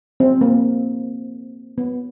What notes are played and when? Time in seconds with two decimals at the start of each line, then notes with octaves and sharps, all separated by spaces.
0.20 C4
0.41 A#3
1.78 B3